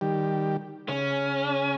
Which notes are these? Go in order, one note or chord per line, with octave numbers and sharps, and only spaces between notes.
D#3 G3 G4
C#3 C#4